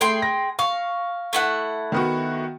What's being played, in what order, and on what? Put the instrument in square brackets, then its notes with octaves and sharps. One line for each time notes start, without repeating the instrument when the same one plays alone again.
[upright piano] A3 [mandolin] G#4 G5 C6
[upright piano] A#6
[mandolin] F5 [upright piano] C#6
[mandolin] A3 E4 F#5
[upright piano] D#3 B3 F#4